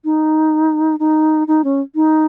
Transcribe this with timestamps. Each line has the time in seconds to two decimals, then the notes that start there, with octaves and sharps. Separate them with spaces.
0.05 D#4
0.99 D#4
1.47 D#4
1.64 C#4
1.95 D#4